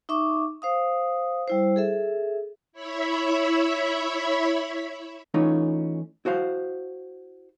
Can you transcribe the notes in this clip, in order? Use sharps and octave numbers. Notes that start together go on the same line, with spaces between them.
D#4 E5 C#6 D6
C5 F5 D#6
G3 E4 C5
G#4 A4 E5
E4 C#5 E5 B5
E3 A3 C#4 D#4 F4
E4 F#4 C5 F5